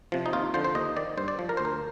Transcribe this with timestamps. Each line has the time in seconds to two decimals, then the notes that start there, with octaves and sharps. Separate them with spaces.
0.12 C3 F3
0.26 D#4
0.33 D#2 F4
0.54 D3 F3 C5
0.64 C5
0.75 D#2 D#5
0.96 D#3 D5
1.17 G2 C5
1.28 D5
1.39 F3
1.49 A#4
1.57 D2 C5
1.65 A#4